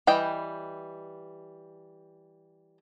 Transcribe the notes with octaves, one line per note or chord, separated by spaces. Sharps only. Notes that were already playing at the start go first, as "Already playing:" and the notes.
E3 G3 D#5 G5